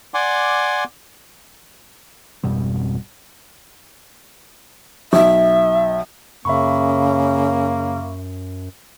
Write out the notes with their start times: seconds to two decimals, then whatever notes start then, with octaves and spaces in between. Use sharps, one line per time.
0.14 D5 F#5 G#5 C6 D6
2.44 G#1 F2 B2 G3
5.13 B1 E5
6.45 F#2 C#3 A#3 E5 B5 C#6